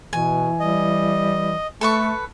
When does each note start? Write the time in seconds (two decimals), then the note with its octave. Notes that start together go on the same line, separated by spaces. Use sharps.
0.13 B2 E3 G#5
0.60 G3 D#5
1.81 A3 A4 B4 C#6